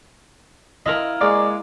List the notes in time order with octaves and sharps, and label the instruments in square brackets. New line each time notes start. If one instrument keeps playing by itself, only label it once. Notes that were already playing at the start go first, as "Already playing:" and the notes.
[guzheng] E4 F4 A#4 [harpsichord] D#5
[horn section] G#3 [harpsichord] A#3 [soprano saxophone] D5